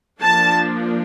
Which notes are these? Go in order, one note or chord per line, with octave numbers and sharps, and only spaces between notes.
F3 A#3 D4 A5